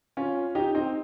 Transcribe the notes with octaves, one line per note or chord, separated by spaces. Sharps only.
C#4 F4
D#4 G4
C4 D#4